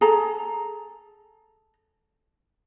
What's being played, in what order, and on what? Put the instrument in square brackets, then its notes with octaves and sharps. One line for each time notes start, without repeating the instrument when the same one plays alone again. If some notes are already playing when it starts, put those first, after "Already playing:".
[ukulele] G#4 A4 A#5